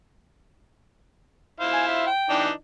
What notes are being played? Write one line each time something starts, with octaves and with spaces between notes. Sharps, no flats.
E4 C5 F5
G#5
E5
G5
E3 D4 D#4